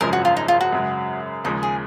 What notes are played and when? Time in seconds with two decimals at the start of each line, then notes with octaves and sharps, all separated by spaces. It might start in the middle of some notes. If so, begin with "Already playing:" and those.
0.01 G#1 F#2 C#3 F3 G#3 A#4
0.13 F#4
0.25 F4
0.37 D#4
0.48 F4
0.61 F#4
0.73 F#2 C#3 G#3
1.45 D#2 C#3 F3 G#3 D#4
1.63 G#4